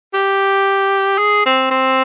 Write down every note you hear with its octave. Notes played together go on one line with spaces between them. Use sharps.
G4
G#4
C4
C4